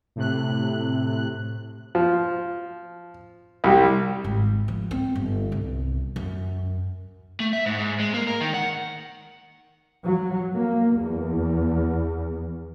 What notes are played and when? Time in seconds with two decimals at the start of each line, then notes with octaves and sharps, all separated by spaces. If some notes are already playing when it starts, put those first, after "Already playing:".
0.16 A2 C3 F#6
1.95 F3
3.64 C2 G3
4.24 G#1
4.68 F3
4.91 C4
5.16 G1
5.52 C2
6.16 F#2
7.40 A3
7.53 E5
7.66 G#2
7.78 G#2
8.00 G#3
8.14 A#3
8.27 A#4
8.41 D#3
8.54 F#5
10.04 F#3
10.55 A#3
10.97 E2